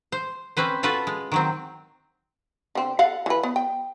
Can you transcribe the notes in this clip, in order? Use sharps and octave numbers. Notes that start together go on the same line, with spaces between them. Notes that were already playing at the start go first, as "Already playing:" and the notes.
C5
C4 C#4 B4 C5
F4 F#4 A4 B4
G#3
D#3 F#3 C4
D3 C4
A4 F5 F#5
E3 B4
B3
G5